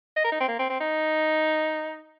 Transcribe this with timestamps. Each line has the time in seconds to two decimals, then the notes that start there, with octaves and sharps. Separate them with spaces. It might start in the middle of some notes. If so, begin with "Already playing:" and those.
0.17 D#5
0.25 A#4
0.32 D#4
0.40 C4
0.48 A#3
0.59 C4
0.69 C4
0.81 D#4